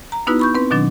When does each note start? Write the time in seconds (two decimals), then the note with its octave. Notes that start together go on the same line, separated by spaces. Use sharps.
0.12 A#5
0.27 B3 D#4 E4 F#4 B4
0.39 B5 C#6 G6
0.55 C4 B4
0.71 B2 D#3 F#3 D4